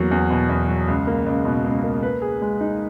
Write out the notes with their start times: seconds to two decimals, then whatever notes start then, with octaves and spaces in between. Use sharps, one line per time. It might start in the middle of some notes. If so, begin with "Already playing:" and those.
Already playing: E2 F#3 A#3
0.11 E2
0.31 B2
0.49 E2
0.68 F#3
0.88 C#2
1.07 A#3
1.26 C#2
1.45 B2
1.64 C#2
1.83 A#3
2.03 B4
2.22 G#4
2.42 G#3
2.61 D#4